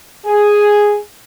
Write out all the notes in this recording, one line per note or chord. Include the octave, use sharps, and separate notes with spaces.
G#4